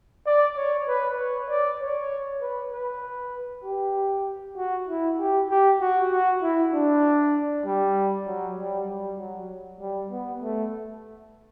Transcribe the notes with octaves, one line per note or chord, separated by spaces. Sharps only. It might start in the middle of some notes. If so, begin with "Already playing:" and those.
D5
C#5
B4
C#5
D5
C#5
B4
B4
G4
F#4
E4
G4
G4
F#4
F#4
E4
D4
G3
F#3
G3
G3
F#3
G3
B3
A3